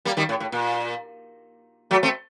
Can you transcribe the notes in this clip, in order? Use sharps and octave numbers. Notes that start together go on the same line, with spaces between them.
G3 A#3
D#3 G3
A2
A2
A#2
F#3 A3
A3 C4